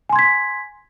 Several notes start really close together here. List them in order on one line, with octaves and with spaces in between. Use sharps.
G#5 C6 G#6 B6